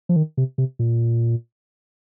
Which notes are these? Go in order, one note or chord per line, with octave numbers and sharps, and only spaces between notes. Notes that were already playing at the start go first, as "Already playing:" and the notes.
F3
D#3
C3
C3
A#2